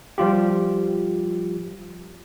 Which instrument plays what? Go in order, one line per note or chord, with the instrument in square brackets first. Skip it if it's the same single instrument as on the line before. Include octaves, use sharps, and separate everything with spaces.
[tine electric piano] F3 G3 F4 G4